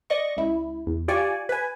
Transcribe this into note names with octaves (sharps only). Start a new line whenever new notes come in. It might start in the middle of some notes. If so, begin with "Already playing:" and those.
D5 D#5 C#6
C#2 E4
E2
F4 G4 D5 G#5 C#6
B4 G#5